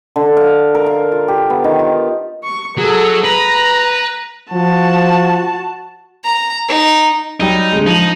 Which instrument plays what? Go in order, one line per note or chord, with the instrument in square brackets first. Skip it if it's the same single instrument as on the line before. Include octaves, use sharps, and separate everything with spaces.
[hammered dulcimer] D3
F5
A#4
F5
F4
G4
B3
D#3
F4
[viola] C#6
[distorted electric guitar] F#3 [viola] G#4 A4
[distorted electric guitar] B4 [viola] A#5
[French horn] F3 [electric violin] F#4 A5
[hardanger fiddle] A#5
D#4
[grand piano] F#3 G3 G5 [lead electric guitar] D#4
[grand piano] D3 G#3
[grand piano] F3 D#7 F#7 [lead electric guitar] D#4